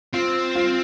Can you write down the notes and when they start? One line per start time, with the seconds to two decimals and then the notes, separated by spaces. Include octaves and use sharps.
0.13 C4 F4
0.55 F4